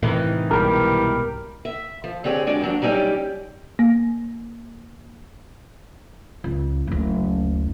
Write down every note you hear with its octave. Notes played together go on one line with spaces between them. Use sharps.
A2 C3 D#3 E3
C2 G#2 B2 G3 A#4
E5
F3
D3 C4 G4 G#4 C#5
G#3 D4 F#4 D5
D#2 G#2 F#3 D4
F#3 G3 C#4 D#4 G4 D5
A#3
C#2
F#1 D2